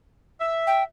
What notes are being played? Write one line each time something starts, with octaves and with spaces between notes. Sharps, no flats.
E5
G5